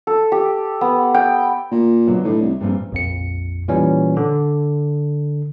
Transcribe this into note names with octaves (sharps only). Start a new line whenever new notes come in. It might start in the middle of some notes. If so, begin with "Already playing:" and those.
A4
G4
B3
G5
A#2
B2 D3 F#3
A2 D4 D#4
C2
A#1 G2 A#2 C4
A#1 F2 C#7
A#2 E3 G3 C#4
D3